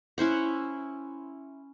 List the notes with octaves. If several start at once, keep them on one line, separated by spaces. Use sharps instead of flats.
C#4 E4 C5 F#5